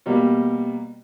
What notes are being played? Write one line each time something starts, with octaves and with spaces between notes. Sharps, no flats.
B2 G3 A#3